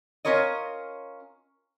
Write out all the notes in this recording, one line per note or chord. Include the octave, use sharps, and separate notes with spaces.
C#4 F4 A#4 C#5 D#5